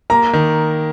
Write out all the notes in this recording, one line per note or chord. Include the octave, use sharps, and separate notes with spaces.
A#3 A#5
D#3